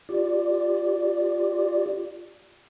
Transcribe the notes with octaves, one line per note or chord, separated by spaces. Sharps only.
F4 G4 D5